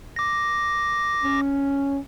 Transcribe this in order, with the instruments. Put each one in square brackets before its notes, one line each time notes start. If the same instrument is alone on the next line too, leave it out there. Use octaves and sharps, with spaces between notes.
[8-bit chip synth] D6 A#6
[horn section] C#4